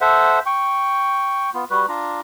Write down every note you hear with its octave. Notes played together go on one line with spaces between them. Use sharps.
A4 C5 E5 F#5
G5 C#6
B3 F4
G3 F#4 B4
D4 F4 A#5